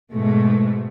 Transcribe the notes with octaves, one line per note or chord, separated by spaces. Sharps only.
G#2 B2 G#3 A3